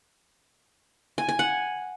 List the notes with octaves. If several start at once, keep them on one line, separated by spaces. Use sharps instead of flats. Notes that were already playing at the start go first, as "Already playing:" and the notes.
G#5
G#5
F#5